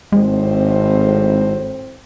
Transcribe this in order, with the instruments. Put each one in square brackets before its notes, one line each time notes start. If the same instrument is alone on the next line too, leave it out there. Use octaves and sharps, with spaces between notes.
[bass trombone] G#1 [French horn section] A2 C4 C5 [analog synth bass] G#3